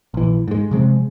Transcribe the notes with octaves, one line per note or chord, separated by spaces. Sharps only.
A#1 E3
G#2 G#3
C3 F3 G#3 C4